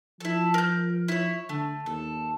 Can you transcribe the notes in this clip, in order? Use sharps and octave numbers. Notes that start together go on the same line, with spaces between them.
F3 E4 A4
A#4 G6
E4 C#5
D3 A3
D#2 A4